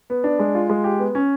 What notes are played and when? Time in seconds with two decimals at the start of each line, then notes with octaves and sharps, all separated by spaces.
0.10 B3
0.24 D4
0.39 G#3
0.55 F4
0.69 G#3
0.84 G4
0.99 B3
1.15 C#4